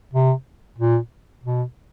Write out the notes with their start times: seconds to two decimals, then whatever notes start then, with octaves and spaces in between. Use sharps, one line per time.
0.13 C3
0.78 A#2
1.43 B2